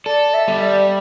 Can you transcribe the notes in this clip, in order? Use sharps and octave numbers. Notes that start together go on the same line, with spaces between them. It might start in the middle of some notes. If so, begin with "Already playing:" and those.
A4 D5
E5
G3
D5